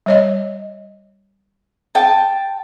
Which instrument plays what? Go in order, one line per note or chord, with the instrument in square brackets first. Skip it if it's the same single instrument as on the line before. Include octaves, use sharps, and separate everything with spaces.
[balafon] G3 C#5 D#5
[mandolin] G5 A5